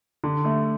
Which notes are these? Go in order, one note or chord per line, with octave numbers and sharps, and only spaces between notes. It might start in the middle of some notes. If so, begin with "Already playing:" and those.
D3
A3